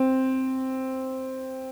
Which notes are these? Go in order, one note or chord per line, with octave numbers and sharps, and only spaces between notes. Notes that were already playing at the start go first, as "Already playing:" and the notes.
Already playing: C4